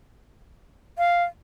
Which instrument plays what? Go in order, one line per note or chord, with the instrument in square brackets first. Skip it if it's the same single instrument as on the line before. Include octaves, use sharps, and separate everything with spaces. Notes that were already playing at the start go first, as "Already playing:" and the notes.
[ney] F5